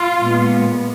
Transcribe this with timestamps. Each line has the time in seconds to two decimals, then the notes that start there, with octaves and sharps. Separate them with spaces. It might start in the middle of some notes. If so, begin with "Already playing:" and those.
Already playing: F4
0.20 A#2 G#3 B3